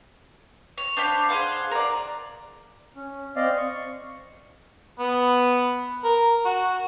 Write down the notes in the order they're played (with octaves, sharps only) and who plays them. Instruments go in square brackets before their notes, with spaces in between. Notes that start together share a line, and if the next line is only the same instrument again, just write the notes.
[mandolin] C#5
D4 C5 F5 B5
G#4 C5 F5 F#5
A#4 D5
[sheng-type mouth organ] C#4
C4 D5 D#5 F5
C#6
[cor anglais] B3
A#4
F#4